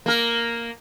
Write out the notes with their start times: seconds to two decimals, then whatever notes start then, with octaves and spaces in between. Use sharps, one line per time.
0.06 A#3 A#4